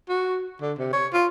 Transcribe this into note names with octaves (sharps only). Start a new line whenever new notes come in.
F#4
D3
C3
C#5
F4